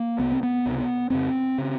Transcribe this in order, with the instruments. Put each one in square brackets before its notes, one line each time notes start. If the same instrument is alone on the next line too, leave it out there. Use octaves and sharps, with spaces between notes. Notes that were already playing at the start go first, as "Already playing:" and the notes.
Already playing: [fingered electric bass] A#3
C2 C3 B3
C4
B3
C#2 C3
F2 C#3 C4
C#3